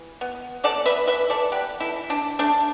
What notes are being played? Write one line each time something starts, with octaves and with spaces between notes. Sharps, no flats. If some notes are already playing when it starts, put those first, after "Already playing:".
Already playing: E3
B3
B3 A4 D5
B4 E5
E3 B4 E5
A4 D5
B3 G4 B4
E4 A4
E3
D4
A3 D4